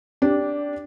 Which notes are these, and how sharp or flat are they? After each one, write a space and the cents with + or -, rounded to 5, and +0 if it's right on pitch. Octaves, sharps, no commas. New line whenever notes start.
D4 -10 G4 +0